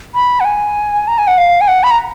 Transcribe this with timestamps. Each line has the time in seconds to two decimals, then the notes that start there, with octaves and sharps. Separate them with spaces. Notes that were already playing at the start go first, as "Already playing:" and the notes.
0.15 B5
0.40 F#5
0.45 G#5
1.08 A#5
1.18 G#5
1.27 F#5
1.38 F5
1.61 G#5
1.68 F#5
1.83 B5
1.91 A#5